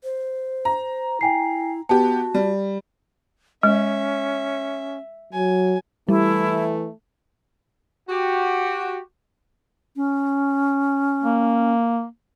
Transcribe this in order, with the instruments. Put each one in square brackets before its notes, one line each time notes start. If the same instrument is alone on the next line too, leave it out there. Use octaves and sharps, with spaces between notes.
[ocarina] C5
[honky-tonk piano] A#5
[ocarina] E4 [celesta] G5 G#5 C7
[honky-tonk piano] B3 G4 [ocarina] F#4 [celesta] A5
[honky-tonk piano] G3
[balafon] G#3 [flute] C#4 [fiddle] E5
[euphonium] F#3 [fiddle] G#5
[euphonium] E3 [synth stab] G3 [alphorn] A3 [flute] E4
[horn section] F#4 G4
[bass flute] C#4
[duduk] A#3